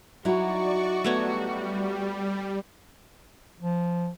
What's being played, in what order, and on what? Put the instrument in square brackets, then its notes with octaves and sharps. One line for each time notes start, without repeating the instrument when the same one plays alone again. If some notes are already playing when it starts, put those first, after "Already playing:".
[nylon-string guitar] F#3 D#4 E4 [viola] F#4 [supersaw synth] D5 C#6
[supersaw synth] G3 [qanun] A3 B3 C#5
[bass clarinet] F3